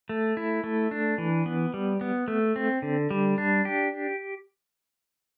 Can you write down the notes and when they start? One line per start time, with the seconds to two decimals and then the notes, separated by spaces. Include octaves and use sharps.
0.09 A3
0.37 E4
0.64 A3
0.91 D4
1.18 E3
1.46 B3
1.74 G3
2.01 B3
2.28 A3
2.56 C4
2.82 D3
3.11 G3
3.38 D4
3.65 G4